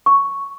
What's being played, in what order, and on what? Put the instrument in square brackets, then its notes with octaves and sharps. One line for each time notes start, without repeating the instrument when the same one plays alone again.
[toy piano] C#6